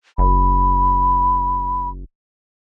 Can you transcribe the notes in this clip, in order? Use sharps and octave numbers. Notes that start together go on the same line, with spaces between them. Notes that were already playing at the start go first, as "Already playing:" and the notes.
F#1 B5